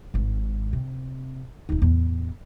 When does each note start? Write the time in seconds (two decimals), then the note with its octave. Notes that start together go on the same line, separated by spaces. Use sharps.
0.14 G#1 G#2
0.73 C3
1.69 D1 D#4
1.82 E2 A2